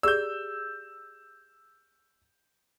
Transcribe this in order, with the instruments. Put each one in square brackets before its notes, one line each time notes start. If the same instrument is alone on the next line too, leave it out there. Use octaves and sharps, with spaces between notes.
[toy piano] G4 G#4 D5 [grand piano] E6 G6